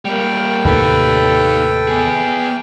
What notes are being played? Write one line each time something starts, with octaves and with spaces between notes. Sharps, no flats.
G3 A#3 G5
D#2 A2 C3 D#4 G4 A4 B4
B3 G#4